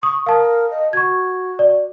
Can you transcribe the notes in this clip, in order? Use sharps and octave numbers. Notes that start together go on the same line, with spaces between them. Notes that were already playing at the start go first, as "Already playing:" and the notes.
C#6 D#6
A#4 F5 A5 D#6
D#5
F#4 C#6 G#6
D5